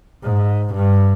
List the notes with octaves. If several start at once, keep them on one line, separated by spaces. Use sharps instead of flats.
G#2
G2